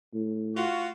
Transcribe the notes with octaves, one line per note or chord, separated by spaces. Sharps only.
A2
F4 F#4